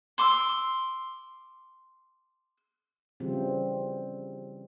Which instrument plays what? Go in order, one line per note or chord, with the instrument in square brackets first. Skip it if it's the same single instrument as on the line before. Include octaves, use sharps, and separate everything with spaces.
[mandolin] C6 D6 E6
[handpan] C#3 E3 F3 G3 C4